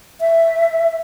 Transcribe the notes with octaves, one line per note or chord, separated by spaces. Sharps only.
E5